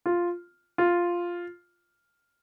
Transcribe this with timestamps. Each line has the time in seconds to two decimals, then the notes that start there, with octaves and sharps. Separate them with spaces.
0.06 F4
0.78 F4